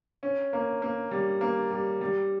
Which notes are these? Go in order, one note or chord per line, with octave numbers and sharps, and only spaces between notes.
C#4
A#3
A#3
G3
A#3
G3
G3